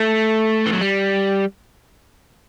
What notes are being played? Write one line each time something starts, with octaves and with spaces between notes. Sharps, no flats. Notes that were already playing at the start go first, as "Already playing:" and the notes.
Already playing: A3
E3
F#3
G3